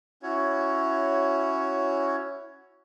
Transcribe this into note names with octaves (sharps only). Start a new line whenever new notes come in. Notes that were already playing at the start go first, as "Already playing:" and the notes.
C#4 E4 F#4 C#5